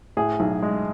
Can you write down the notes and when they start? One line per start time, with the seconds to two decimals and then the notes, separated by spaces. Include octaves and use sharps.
0.17 A2 G#4
0.40 B1
0.63 G#3